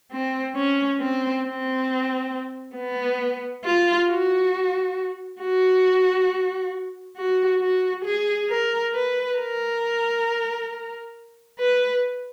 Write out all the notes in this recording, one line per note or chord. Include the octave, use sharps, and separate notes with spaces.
C4
C#4
C4
C4
B3
F4
F#4
F#4
F#4
F#4
G#4
A#4
B4
A#4
B4